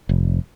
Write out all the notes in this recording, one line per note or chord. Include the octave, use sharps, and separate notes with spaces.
F1